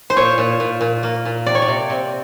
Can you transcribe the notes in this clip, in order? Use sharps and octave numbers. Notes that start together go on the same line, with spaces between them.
C5
A#2 C#5
A#2
A#2
A#2
A#3
A#2
C3 D5
C#5
D5
C3
C3